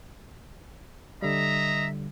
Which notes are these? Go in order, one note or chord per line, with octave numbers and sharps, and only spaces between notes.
D3 G3 D#5 E5 A#5